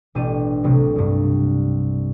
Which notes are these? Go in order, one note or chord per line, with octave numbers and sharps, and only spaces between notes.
A1 B2 D4 G4 D#7
C2 A2 C3 F#3 A3
C2 G2